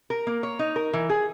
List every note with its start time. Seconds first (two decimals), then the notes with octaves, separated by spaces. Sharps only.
0.10 A#4
0.27 A#3
0.43 C#5
0.59 D#4
0.76 A#4
0.93 E3
1.10 G#4